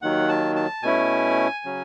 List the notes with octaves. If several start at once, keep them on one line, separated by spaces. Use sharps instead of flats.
D#2 D#3 F#3 F#5
A5
A5
B2 A3 C#4 E4 G#5
C#3 F#3 C#4